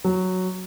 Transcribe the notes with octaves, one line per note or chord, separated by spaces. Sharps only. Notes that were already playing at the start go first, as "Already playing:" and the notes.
F#3